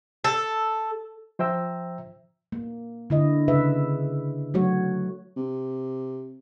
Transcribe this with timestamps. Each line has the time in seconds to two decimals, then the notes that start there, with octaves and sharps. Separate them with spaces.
0.24 A4
1.39 F3 C5 E5 G5 A#5 E6
2.52 A#3
3.10 D3 E4 D#5
3.48 C#3 B4 E5
4.54 F#3 A3 F#4 C#5
5.37 C3